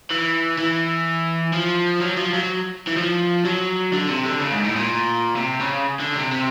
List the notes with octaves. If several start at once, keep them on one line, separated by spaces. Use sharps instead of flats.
E3
E3
F3
F#3
F3
F#3
E3
F3
F#3
D3
C3
D3
C#3
G#2
A2
A#2
C3
C#3
D3
C3
C3